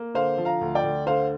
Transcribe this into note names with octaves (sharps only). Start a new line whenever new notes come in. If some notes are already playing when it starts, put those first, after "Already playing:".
Already playing: A#3
D3 C5 F5
F3
F5 A#5
D2
D5 G5
D2
D3 C5 F5